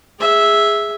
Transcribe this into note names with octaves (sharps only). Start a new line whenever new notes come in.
G#4 E5